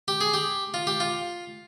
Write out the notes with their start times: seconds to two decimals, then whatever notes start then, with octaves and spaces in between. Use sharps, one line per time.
0.08 G4
0.21 G#4
0.34 G4
0.74 F4
0.87 G4
1.00 F4